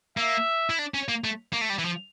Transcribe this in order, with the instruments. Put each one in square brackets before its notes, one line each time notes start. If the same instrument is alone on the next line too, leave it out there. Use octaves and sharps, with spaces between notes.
[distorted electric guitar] A#3 [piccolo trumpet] E5
[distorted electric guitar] E4
D4
C#4
A#3
A3
A#3
A3
G3
E3
F3